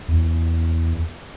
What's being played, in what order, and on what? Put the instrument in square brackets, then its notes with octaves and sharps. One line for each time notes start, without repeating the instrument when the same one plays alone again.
[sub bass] E2